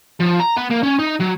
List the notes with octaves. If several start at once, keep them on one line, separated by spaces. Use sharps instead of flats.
F3
A#5
B3
A#3
C#4
D#4
F#3